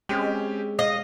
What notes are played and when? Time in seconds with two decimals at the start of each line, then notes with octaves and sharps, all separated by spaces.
0.09 G#3 C4 C#4 G4
0.79 D#5 F5